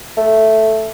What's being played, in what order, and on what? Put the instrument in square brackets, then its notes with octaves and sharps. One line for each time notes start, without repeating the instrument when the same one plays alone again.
[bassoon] A3